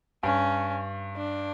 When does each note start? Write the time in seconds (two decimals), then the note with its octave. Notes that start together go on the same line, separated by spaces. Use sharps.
0.23 G2 C#4
1.17 D4